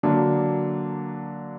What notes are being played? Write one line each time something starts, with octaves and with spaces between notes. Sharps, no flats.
D3 F#3 A#3 D4